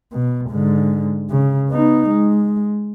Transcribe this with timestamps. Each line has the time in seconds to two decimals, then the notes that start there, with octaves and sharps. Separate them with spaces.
0.13 B2
0.50 G#2 D3
1.30 C#3
1.71 B3 D#4
2.09 G#3